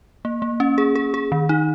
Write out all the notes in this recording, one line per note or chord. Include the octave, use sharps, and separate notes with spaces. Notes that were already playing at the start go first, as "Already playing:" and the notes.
A#3
A#3
C#4
G#4
G#4
G#4
D#3
D#4